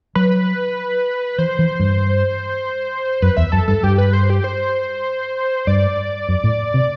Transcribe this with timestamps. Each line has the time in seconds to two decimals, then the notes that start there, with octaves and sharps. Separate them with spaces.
0.15 F#3 B4
1.38 E3 C5
1.59 E3
1.80 G2
3.22 F#2 B4
3.37 E2 E5
3.52 F#2 A4
3.68 G2 A4
3.83 G2 G4
3.98 B4
4.13 C5
4.30 G4
4.44 C5
5.67 G2 D5
6.29 F#2
6.44 A2
6.74 C3